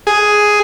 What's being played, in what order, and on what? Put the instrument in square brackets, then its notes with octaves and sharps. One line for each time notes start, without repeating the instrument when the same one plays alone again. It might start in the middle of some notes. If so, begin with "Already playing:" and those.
[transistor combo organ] G#4